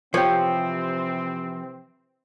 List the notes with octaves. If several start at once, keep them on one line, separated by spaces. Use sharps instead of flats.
C3 E3 F3 C4 G4 C#5